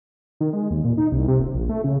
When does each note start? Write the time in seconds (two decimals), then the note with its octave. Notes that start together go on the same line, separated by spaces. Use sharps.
0.40 D#3
0.53 G#3
0.71 D#2
0.84 A#2
0.97 D#4
1.12 C2
1.28 C3
1.40 D#1
1.54 A#1
1.69 A3
1.84 C#3